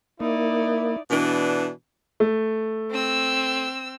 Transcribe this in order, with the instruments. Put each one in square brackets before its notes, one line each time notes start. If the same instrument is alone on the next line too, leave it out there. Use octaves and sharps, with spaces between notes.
[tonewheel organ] A#3 [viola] D#4 D5 [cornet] E4
[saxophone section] B2 E3 D4
[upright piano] A3
[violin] C4 E6